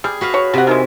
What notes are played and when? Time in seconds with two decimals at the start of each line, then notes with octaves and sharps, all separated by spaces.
0.04 G3 G#4
0.21 F#4 B4 F5
0.34 C#5
0.54 C3 F#4 F#5
0.67 D#3 E3 G#3